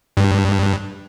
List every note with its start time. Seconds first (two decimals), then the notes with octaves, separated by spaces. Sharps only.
0.17 G2